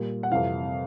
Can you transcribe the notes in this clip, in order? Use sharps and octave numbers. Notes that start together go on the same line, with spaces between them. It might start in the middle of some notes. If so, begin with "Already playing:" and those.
Already playing: A#2 G3
F#5
F2 C3 E3 G3 F5